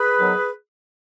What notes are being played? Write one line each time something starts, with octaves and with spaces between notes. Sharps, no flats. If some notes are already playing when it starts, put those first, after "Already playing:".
Already playing: G#4 B4
D#3 F#3 B3